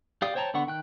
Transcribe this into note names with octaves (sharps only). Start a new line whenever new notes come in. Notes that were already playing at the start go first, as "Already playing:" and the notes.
G4 D5 F5 G5 D#6
C5 C#5 G5 A5 A#5
D3 B3 F#5 C#6
D#3 G5 F#6